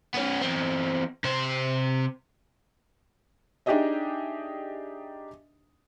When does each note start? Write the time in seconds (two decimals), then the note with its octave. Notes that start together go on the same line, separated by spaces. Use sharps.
0.14 B3 C#4
0.42 E2 C4
1.24 C3 C5
3.66 D4 D#4 G4 G#4 D#5 E5